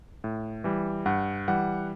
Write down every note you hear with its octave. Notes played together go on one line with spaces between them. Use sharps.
A2
E3 G3
G2 F#5
E3 G3 F#5